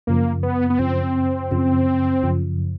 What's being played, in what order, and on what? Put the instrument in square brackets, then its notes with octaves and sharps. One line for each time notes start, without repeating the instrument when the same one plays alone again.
[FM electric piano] F#2 C#3 F3 [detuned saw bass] A#3
[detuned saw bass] B3
B3
[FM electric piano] F#2 C#3 F3 [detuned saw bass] C4
[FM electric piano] F#2 C#3 F3
F#2 C#3 F3